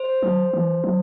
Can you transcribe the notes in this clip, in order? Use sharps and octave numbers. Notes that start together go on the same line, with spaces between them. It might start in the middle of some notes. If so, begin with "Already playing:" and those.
Already playing: C5
F#3
E3
F#3